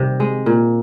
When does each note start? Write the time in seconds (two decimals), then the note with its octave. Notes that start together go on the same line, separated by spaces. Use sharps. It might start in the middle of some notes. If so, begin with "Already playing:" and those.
Already playing: C3 D#3 G3 C4
0.20 G#3
0.46 A#2